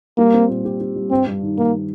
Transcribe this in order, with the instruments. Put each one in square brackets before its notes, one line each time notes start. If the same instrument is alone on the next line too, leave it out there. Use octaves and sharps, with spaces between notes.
[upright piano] G3 [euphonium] A#3
[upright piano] C4
A#2
G4
G4
G3
[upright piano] G2 [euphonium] C4
[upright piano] G2
D#3
[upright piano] D#3 [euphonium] A#3